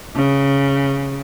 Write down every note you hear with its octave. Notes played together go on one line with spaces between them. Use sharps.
C#3